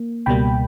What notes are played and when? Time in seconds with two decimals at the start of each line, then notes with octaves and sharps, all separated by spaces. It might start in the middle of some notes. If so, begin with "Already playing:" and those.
Already playing: A#3
0.26 C#2 B2 G3 A#3 G5 B5